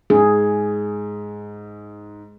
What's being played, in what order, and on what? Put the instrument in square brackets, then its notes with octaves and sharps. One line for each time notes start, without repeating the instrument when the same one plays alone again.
[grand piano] G#2 [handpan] G#4